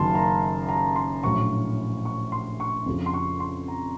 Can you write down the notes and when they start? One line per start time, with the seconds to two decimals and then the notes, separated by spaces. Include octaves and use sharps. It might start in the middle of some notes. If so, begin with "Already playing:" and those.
Already playing: F#1 F#2 D#3 A#3 A5 C6
0.15 A#5
0.69 A#5
0.96 C6
1.23 A#1 A2 F#3 C#6
2.05 C#6
2.32 C6
2.60 C#6
2.86 F2 C#3 F3
3.06 C6
3.14 C#6
3.40 C6
3.68 A#5